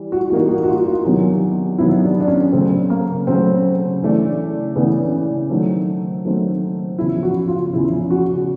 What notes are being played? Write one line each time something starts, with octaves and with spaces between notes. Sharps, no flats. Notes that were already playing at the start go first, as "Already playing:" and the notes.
Already playing: E3 G3
F#4
E3 G3 A#3 D#4 F#4
F#4
F#4
F4
F4
E2 C3 D#3 F#3 B3
E2 C3 D#3 F#3 B3 E4
D4
D4
C#4
C#3 F#3 A3 C4
A#3
C#3 F#3 A3 C4
C#3 E3 A3 D4
C#3 E3 A3 B3 D4
D#3 F#3 A3 C4
D#3 F#3 A3 C4
E2 C#3 F3 E4
F#4
F4
E2 C#3 F3 E4
F#4